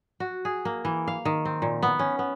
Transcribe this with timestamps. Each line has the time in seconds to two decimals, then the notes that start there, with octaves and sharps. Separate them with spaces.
0.20 F#4
0.45 G#4
0.65 A#3
0.85 E3
1.08 F5
1.25 D#3
1.45 C4
1.62 A#2
1.83 B3
1.99 C#4
2.19 B3